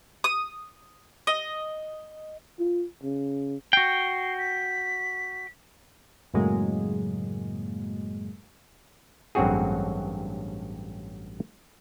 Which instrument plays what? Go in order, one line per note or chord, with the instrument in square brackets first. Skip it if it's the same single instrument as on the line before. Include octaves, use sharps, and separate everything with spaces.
[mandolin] D#6
D#5
[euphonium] F4
C#3
[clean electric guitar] F#4 G5 [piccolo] C7
[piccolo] B6
[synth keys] F#2 A2 C#3 F#3 G#3 A#3
[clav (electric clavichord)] A1 G2 F#3 C4 F#4 G#4